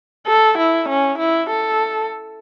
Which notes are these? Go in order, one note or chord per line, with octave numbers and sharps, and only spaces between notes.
A4
E4
C#4
E4
A4